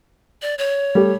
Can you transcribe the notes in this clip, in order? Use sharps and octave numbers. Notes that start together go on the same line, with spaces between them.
D5
C#5
G3 A3 G4